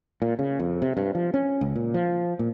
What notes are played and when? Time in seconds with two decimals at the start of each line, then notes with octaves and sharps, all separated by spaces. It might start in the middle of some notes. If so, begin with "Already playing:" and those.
0.22 A#2
0.39 C#3
0.59 F2
0.82 C3
0.97 G2
1.15 F3
1.34 C#4
1.61 C#2
1.76 A#2
1.94 F3
2.39 A#2